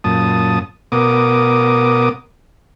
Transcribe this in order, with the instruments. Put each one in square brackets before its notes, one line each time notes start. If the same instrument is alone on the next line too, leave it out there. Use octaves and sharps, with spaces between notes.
[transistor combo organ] F#2 A#2 A5 D#6
B2 B3 A#4 D6 D#6